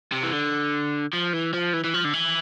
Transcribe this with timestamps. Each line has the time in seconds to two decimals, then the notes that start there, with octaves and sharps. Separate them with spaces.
0.12 C3
0.23 E3
0.33 D3
1.13 F3
1.33 E3
1.54 F3
1.73 E3
1.84 E3
1.94 F3
2.05 D3
2.14 E3